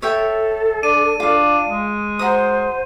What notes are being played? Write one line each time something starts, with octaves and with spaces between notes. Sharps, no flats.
A4 C#5 E5 G5
D4 D#7
D4 F4 F5
G#3
F#4 C5 A#5 D#6